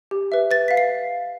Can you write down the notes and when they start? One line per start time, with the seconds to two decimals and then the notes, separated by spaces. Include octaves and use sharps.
0.11 G4
0.32 B4 E5
0.51 B4 A6
0.68 F5 B6
0.77 C7